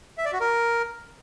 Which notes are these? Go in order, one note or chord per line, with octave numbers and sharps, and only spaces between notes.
E5
D5
F#4
A#4